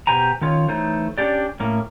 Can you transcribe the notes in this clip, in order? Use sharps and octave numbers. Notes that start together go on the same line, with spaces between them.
B2 G4 C5 G#5 A#5
D#3 C#4 F4 C#5
E3 A3 D#4 C5 C#5
C#4 D4 G4 D5
A2 A#3 C#4